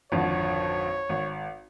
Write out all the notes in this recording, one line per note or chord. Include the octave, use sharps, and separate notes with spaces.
G#1 F2 D3 C#5
G#1